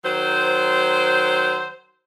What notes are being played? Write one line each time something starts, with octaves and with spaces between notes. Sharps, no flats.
D#3 F#3 C5